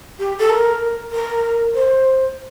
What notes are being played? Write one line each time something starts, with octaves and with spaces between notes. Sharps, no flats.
G4
A4
A#4
A#4
C5